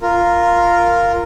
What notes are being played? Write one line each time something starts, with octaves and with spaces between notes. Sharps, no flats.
F4 A#4